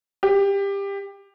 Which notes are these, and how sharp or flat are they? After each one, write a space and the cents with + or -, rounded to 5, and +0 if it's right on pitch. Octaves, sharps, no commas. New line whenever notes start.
G4 +20